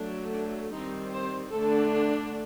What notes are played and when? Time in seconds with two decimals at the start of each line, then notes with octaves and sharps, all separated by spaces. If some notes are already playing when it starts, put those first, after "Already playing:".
Already playing: F#3 A3 D4
0.32 D4
0.73 D#3 G3 C4 D#4
1.13 C5
1.53 D3 A3 D4 A4